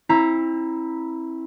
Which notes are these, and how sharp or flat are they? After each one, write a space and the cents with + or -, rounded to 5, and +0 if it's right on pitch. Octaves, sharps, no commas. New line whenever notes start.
C4 +35 E4 -10 A#5 +0